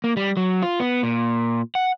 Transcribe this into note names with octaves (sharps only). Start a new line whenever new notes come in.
A#3
G3
F#3
F4
B3
A#2
F#5